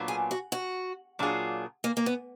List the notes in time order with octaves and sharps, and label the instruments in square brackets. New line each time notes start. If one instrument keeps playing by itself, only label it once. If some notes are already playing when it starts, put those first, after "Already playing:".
Already playing: [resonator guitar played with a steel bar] A#2 F#3 B3 D4 F4
[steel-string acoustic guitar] G#4
F#4
F#4
[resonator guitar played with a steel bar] A#2 F#3 D4 F4 G#4
[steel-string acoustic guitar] A#3
A#3
B3